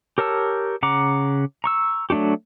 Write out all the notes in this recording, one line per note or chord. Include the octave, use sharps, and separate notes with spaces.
G4 A#4 C#5 A5 E6
C#3 F#5 A#5 D6
A#5 C#6 E6
F#3 A3 D4 F#4 G4